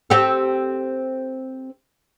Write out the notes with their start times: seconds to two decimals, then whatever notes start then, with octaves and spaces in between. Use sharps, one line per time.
0.10 C4 G4 A4